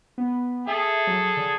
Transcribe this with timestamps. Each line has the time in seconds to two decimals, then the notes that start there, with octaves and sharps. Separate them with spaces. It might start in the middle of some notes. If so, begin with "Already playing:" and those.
0.18 B3
0.68 G#4 A4 E5
1.07 F#3
1.37 D3